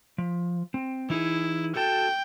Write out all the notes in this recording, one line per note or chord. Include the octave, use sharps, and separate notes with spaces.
F3
C4
E3 D#4 E4 G#4
F#4 A4 G5 A5